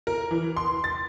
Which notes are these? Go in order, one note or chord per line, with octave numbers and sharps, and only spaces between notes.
A#4
E3
C6
A6